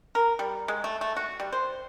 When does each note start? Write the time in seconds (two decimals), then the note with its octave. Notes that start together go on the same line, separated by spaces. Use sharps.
0.15 A#4
0.39 G3
0.68 G#3
0.84 A3
1.01 A3
1.16 F#4
1.40 G3
1.53 C5